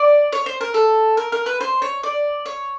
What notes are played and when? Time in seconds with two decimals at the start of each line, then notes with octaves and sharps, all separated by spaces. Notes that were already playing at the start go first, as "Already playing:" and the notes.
Already playing: D5
0.33 C#5
0.46 C5
0.61 A#4
0.74 A4
1.17 A#4
1.32 A#4
1.46 B4
1.60 C5
1.82 C#5
2.03 D5
2.46 C#5